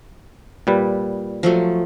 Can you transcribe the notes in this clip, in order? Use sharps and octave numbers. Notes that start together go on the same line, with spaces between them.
A#2 G3 B4
F3 F#3 A3